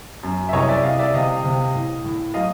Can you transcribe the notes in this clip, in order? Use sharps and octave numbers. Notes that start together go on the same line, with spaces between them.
F#2
E5
C2 C#5 D#5
D5 E5
C2 D#5 F5
D5 E5
C3 D#5 F5
C3
A2
A2
F#3 D#5 F5